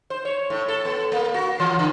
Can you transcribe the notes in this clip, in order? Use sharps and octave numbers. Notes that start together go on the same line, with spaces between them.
C5
C#5
A2
A4
B3
A#3
F#4
E3
D3